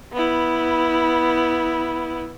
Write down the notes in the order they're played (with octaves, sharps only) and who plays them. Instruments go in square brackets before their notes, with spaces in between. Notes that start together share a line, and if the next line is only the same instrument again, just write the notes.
[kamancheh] B3 E4